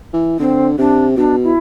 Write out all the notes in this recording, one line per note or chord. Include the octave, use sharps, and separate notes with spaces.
E3
D3 C4
C3 D4
B2 D4
E4